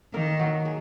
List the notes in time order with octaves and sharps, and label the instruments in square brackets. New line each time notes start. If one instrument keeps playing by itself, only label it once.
[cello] D#3 [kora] A#3 A#4
[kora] F#3 F#4
G#4